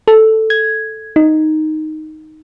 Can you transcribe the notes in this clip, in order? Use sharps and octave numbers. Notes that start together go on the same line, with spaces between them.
A4
G#6
D#4